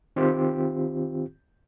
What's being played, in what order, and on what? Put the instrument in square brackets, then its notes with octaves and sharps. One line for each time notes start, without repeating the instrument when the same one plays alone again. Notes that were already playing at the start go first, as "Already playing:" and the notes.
[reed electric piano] D#3 C4 F4 G4